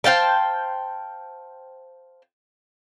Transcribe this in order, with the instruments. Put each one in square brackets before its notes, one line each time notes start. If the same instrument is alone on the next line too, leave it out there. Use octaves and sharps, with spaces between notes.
[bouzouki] C5 F5 G5 A5